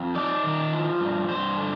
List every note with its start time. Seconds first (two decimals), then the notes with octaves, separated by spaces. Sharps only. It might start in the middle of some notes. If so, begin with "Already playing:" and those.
Already playing: F2
0.15 D#4 D5
0.43 D#3
0.72 F3
1.00 G2
1.29 G2 C5
1.57 D3